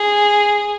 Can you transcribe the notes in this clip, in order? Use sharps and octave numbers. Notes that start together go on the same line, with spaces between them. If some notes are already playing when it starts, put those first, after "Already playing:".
Already playing: G#4